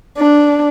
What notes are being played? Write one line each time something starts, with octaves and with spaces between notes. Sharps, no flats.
D4